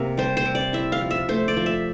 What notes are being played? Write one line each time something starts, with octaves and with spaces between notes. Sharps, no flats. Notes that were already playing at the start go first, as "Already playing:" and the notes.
Already playing: C3 A#3 A#4
G3 C5
C5
C3
D5
E4 E5
F5
F3
E5
A3 C5
D5
F3
E5